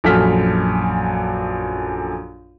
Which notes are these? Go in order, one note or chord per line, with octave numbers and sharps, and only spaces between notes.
A#1 F#2 A4 F6 B6